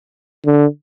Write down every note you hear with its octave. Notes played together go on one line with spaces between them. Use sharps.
D3